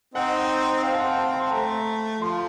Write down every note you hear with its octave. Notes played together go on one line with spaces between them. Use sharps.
C4 D#4 F#5
C4 F5
A5
F#5
A5
C6
A3 A#5
F3 C6